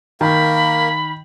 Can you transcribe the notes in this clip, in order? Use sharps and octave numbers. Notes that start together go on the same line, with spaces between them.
D#3 A#3 A#4 B5